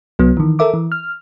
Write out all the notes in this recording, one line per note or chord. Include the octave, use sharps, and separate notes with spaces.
C2 F#3 B3
D#3 E3
A4 A#4 E5 D6
E3
F6